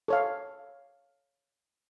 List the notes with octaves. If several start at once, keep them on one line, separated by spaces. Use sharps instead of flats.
A4 C#5 F5